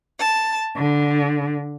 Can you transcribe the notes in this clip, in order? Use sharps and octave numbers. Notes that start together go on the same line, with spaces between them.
A5
D3